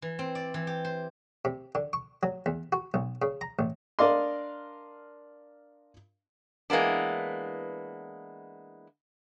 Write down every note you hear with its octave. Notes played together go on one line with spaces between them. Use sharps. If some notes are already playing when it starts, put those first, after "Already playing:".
E3
C4
D5
E3
G4
C5
C3
D3
C#6
F#3
E2
F#4
B1
C#3
A#5
A1
D4 A#4 D5 D#5 F5 C6
E3 G#3 A#3 B3 D4